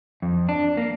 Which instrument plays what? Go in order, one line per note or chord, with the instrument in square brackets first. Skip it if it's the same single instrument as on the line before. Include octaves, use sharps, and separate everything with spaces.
[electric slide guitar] F2
D4
A#3